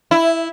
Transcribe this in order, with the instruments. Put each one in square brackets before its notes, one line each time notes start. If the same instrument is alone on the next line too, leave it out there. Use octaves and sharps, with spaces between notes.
[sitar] E4